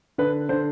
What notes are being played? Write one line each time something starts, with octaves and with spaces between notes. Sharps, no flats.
D3 B4
D3 C5